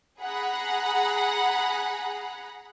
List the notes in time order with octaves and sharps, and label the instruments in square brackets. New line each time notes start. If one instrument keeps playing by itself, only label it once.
[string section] G#4 F#5 A#5 B5